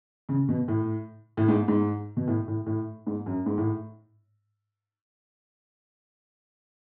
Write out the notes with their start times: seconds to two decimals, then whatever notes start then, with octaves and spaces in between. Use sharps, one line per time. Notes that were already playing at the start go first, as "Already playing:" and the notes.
0.29 C#3
0.48 B2
0.68 A2
1.37 A2
1.48 G#2
1.68 G#2
2.17 B2
2.27 A2
2.48 A2
2.66 A2
3.07 G#2
3.26 F#2
3.46 G#2
3.58 A2